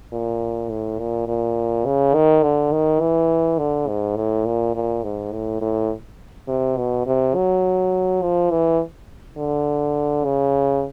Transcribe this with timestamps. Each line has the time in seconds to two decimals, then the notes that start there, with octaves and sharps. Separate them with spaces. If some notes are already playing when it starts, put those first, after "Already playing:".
0.12 A#2
0.69 A2
0.99 A#2
1.27 A#2
1.85 C#3
2.14 D#3
2.43 D3
2.72 D#3
3.01 E3
3.58 D3
3.88 G#2
4.16 A2
4.45 A#2
4.75 A#2
5.03 G#2
5.32 A2
5.61 A2
6.48 C3
6.77 B2
7.06 C3
7.35 F#3
8.22 F3
8.51 E3
9.37 D3
10.25 C#3